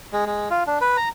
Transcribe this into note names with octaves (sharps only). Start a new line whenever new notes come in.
G#3
G#3
F4
D4
B4
A#5